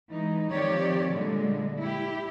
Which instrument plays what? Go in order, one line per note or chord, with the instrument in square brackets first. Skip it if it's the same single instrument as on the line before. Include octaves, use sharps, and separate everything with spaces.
[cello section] E3 G#3 D#4
D#3 F3 C4 G4 C#5 D5
A#2 D3 G3 G#3
E4 G4